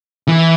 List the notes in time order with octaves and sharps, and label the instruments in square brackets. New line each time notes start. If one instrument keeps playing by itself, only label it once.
[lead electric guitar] E3